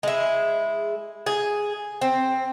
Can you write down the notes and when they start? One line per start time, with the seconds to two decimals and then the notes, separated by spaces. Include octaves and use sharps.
0.03 G#3 E4
1.26 G#4
2.01 C4